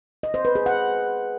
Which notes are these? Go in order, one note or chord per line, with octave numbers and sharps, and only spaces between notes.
D#5
C5
B4
G#4
F#5